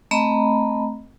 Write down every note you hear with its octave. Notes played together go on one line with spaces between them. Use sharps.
A3 C4 D#5 A#5 B5